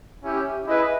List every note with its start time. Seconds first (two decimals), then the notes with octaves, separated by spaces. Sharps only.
0.24 C#4 E4 G4
0.67 E4 G#4 B4 D#5